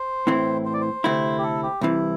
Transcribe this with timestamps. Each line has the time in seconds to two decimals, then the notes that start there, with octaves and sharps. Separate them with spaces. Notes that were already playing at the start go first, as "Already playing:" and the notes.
Already playing: C5
0.27 A2 E3 C4 E4
0.65 C5
0.74 D5
0.81 C5
1.04 D2 C3 A3 C4 E4
1.39 G4
1.43 A4
1.63 G4
1.81 C2 C3 E3 E4